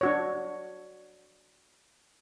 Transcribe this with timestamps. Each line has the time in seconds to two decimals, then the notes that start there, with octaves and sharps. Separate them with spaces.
0.01 D4 F#4 C#5